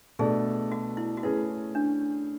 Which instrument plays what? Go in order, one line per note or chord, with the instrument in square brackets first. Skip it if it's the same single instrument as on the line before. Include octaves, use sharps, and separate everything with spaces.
[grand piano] B2 A3 D4 A4 D5 [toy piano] G#4
[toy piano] F#4
E4
F#4
[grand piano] A3 C#4 G#4 B4 [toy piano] E4
[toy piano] D4